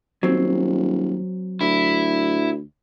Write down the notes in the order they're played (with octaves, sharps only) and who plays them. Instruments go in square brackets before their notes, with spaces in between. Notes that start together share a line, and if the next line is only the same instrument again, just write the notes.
[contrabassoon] D#1 [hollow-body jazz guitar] F#3 C4
[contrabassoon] D2 [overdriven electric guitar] E4